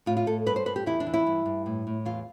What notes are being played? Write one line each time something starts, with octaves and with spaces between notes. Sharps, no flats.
A2 F4
F4
A2 A4
G2 B4
C5
G2 B4
G4
E2 E4
D4
E3
E4
G2
G2
A2
A2
E2 F4